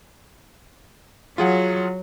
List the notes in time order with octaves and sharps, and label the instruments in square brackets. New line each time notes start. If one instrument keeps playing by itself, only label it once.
[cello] F#3 [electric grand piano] F4 G#4 F#5